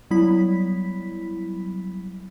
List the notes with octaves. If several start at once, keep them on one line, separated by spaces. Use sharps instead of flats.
F#3 G3 B3 E4 B5 B6